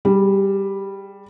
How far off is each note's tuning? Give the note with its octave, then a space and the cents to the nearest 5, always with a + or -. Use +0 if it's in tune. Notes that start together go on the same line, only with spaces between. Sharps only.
G3 +0 G#4 -20